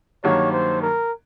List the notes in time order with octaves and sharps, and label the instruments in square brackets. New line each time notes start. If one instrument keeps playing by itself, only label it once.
[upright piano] G2 D#3 F#3 A#3 [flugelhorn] C#5
[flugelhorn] C5
A#4